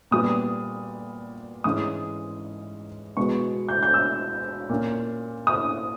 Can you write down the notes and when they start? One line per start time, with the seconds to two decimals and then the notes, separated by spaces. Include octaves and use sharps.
0.11 A#2 G3 B3 D#6
1.64 G#2 E3 G#3 C#4 D#6
3.17 B2 G#3 B3 C#6
3.69 G6
3.83 G6
3.94 E6
4.69 A#2 A#3 C#4
5.47 D#6